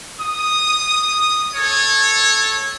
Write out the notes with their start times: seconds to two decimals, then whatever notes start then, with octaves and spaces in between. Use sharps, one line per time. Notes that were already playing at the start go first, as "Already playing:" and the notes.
0.20 D#6
1.54 A4 C#5